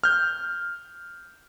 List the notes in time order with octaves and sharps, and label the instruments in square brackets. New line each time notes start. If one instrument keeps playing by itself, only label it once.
[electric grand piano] F6 G6